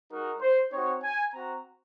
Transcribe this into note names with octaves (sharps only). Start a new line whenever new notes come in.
G#3 D#4 F#4 A#4
C5
C4 D#4 F#4 C#5
G#5
C4 F#4 A#5